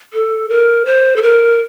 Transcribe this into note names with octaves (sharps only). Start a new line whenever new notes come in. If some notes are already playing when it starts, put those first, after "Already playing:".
A4
A#4
C5
A4
A#4